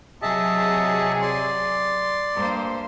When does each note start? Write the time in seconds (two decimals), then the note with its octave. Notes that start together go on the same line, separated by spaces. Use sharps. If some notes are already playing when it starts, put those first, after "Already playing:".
0.22 C3 F#3 G#4 D#5 E5 A5
1.22 D5 C6
2.35 G2 A#3 C5